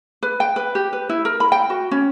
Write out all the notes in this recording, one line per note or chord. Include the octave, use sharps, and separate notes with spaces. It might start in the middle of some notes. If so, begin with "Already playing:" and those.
B4
G5
B4
G4
B4
E4
A#4
B5
G5
F#4
C#4